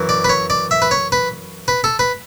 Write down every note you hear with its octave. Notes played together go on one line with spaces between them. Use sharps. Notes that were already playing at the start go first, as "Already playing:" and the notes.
Already playing: F#2 E3
D5
B4
C#5
D5
E5
B4
C#5
B4
B4
A4
B4